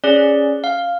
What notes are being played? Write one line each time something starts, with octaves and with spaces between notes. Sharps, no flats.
C#4 G#4 D5
F5